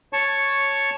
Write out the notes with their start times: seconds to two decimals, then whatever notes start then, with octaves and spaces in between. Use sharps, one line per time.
0.13 C#5 A5 C#6